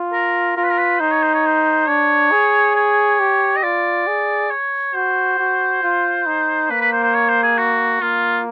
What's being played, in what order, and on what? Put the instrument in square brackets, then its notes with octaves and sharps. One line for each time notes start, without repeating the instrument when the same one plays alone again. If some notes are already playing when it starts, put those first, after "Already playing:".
Already playing: [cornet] F4
[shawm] A#4
[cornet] F4 [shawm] A#4
[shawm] B4
A#4
B4
[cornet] D#4 [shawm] C5
[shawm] C#5
C5
C#5
C5
[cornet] D4 [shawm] C#5
[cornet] G#4
[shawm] C#5
[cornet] G4
[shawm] D#5
[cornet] F4 [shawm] D5
[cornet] G#4
[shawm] C#5
[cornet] F#4 [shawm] C5
[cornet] F#4
F4
D#4
[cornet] A#3 [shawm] B4
[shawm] B4
C5
C5
C#5
C5
G#4
F#4
[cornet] A#3 [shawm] F4